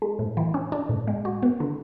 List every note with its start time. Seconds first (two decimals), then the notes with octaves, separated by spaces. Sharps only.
0.02 G#3
0.19 A2
0.37 E3
0.54 C#4
0.72 D4
0.89 A2
1.07 G#3
1.25 F#4
1.43 B3
1.60 D3